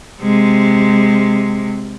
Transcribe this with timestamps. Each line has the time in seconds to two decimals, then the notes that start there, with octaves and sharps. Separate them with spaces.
0.22 C3 G#3